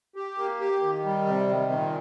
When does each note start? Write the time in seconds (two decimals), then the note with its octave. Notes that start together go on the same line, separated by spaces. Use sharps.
0.16 G4
0.38 A#3
0.60 G4
0.83 D#3
1.05 G3
1.27 C3
1.49 D#3
1.71 A#2